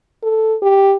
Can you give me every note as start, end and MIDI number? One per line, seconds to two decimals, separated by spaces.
0.23 0.56 69
0.62 0.95 67